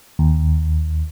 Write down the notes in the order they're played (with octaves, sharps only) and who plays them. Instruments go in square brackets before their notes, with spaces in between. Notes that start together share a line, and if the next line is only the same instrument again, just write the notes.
[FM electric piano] D#2